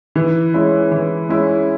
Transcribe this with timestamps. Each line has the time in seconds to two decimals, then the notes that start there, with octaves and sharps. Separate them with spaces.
0.16 E3
0.54 G#3 C#4 E4
0.92 E3
1.29 G#3 C#4 E4